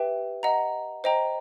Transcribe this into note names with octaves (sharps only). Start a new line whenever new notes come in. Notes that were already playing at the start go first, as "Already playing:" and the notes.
Already playing: G4 B4 E5 G5
D#5 F#5 A#5
C5 D#5 G5 A#5